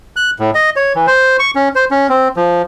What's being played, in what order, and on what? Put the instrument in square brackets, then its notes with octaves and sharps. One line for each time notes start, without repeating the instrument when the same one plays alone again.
[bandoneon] F#6
A2
D#5
C#5
E3
C5
C#6
C#4
C5
C#4
C4
F3